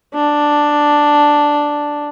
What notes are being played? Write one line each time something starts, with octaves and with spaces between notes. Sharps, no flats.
D4